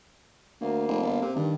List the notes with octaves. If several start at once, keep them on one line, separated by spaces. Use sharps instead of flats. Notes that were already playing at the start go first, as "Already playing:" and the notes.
D2 A#3
F1
G1
C3
G2 D#3